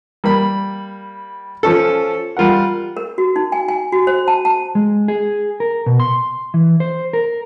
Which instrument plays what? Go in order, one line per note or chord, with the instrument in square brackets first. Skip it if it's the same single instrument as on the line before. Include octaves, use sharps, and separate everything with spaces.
[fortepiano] G3 A#3 B5
F3 C#4 A4
G3 F4 A#4 F#5
[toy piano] A#4
F#4
D#4
G#5
G#5
F#4
C5
A5
A5
[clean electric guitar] G#3
G#4
A#4
B2
C6
E3
C5
A#4